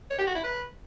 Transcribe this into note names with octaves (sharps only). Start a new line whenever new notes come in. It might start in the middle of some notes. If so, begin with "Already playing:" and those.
C#5
G4
F#4
E4
B4